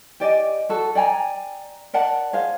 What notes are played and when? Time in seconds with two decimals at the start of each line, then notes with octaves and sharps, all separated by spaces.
0.20 G4 D5 D#5 G#5
0.69 F#4 A4
0.95 D5 G5 G#5 A#5
1.94 A#4 D5 F#5 A5
2.33 G#4 C5 F5